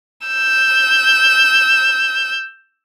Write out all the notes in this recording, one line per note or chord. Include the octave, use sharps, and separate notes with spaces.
E6 G6